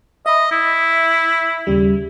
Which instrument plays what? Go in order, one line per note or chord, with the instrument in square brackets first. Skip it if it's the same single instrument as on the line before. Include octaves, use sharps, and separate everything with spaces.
[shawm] D#5 [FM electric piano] E5 B5
[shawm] E4
[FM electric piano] D#2 C#3 G3